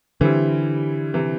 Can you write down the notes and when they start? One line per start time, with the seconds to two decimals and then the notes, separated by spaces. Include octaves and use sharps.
0.21 D3 E3 G3 C4 E4
1.14 C3 E3